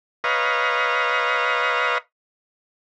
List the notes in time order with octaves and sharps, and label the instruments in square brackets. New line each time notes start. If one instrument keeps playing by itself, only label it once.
[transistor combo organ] B4 C#5 D#5 F5 A#5